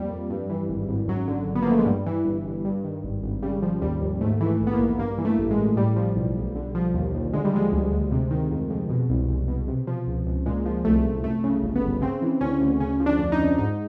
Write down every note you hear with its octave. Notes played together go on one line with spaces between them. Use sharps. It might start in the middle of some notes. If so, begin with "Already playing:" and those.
Already playing: F2 F3 G3 A#3
F2
G2
E3
G#1
G#1
F#2 F#3
D3
G#1
B3
A#3
F3 A3
G#3
G2 G3
E3
G1
G1
G2
D#3
G#1
G#1
C#3 G3
F3
D#2 G3
D#2
G#2 A3
E3
A3
A#1
B3
A#3
A#1
G2 A#3
E3
A3
A1
G#3
A1
A2 G3
F3
B1
B1
D3
F3
D#2
D#2
D3 G#3
G3
F3 G#3
D2
D2
C3
D#3
F2
F2
B2
C2
C2
B2
C3
F3
C#2
C#2
A#2 G#3
F3
C2 A3
C2
F#2 A3
C#3
G1
B3
G1
C#3 C4
E3
D2 C#4
D2
C#3 C#4
F3
D4
F2
D#4
F2
G#2 D#4